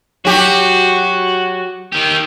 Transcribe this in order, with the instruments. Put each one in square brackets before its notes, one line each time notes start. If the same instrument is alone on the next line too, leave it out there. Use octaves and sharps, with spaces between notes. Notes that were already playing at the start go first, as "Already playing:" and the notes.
[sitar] F#3 G4 [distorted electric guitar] F#4
[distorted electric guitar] D#3 G4